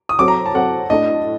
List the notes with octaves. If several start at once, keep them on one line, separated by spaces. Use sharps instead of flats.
D#6
F#3 C4 F#4 A4 D6
A#5
A5
F#3 C4 F#4 A4 F#5
A2 A3 D4 D#5